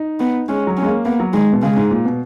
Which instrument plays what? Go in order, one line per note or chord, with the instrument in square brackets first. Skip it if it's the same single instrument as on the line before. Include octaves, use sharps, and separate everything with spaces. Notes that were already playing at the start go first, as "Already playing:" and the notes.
Already playing: [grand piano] D#4
[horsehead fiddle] B3
[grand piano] G#3 [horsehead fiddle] C#4
[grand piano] F#3
[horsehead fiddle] C#4
[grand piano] G#3
A#3
[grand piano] A#3 [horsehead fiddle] B3
[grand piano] F#3
[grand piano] D#3 [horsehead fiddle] G#3
[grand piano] B2
[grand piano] C#3 [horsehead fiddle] G#3
[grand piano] G#2
A#2
B2